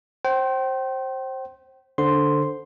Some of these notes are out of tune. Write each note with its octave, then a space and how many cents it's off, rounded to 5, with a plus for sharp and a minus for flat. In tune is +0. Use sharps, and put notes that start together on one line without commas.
C5 +20 G5 -30
D3 +0 C5 +0 C6 +0